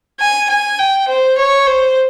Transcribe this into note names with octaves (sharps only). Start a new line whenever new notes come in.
G#5
G#5
G5
C5
C#5
C5